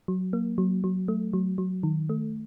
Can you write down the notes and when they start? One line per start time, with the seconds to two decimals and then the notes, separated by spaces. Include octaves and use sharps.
0.08 F#3
0.33 A#3
0.58 F#3
0.84 F#3
1.08 A3
1.33 F#3
1.58 F#3
1.83 D#3
2.09 A3